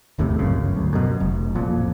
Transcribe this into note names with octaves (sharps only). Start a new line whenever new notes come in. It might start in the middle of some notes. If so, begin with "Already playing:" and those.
G1 D#2 A2 C3
G1 C#2 F#2 C#3
D2
F#2 B2
F1
A1 F2 A#2